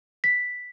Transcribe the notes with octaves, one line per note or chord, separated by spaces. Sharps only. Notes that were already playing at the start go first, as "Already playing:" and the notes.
B6